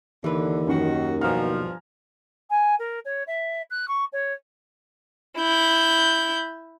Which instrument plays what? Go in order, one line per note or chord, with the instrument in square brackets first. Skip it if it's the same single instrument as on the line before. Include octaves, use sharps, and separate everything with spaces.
[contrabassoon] D#2 [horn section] D3 [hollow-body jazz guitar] E3 B4
[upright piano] F#2 [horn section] D#3 F#4
[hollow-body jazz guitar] B1 F#4 [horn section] G2 B2 F3 [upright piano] G#5 A#5 F6
[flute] G#5
A#4
C#5
E5
F#6
C#6
C#5
[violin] E4 G6